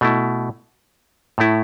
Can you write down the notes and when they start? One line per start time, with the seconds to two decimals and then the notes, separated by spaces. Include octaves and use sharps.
0.01 B2 A3 E4
1.38 A2 A3 E4